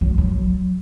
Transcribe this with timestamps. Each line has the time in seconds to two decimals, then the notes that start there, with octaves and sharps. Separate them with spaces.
0.01 F#3
0.18 F#3